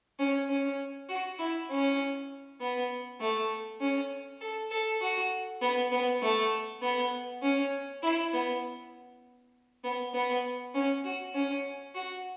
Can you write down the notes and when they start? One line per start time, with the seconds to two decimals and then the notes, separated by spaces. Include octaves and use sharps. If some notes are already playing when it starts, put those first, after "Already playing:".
0.19 C#4
0.50 C#4
1.09 F#4
1.39 E4
1.71 C#4
2.61 B3
3.20 A3
3.81 C#4
4.41 A4
4.71 A4
5.01 F#4
5.62 B3
5.92 B3
6.22 A3
6.82 B3
7.42 C#4
8.03 E4
8.33 B3
9.84 B3
10.14 B3
10.75 C#4
11.04 F#4
11.35 C#4
11.95 F#4